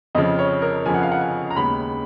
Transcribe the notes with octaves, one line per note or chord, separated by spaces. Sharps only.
F2 C#3 F3 D#5
C#5
A#4
F2 C#3 F3 G#5
F#5
F5
F#5
G#5
A#5
D#2 C#3 G#3 B3 B5